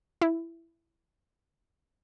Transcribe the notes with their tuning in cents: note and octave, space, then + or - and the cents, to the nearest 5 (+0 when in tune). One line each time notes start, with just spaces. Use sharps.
E4 +10